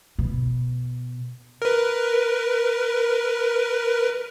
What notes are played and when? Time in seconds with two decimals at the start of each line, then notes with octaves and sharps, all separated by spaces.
0.19 B2
1.62 A#4 B4